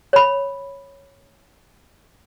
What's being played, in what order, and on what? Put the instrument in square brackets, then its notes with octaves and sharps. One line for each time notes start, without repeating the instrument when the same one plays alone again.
[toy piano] C#5 B5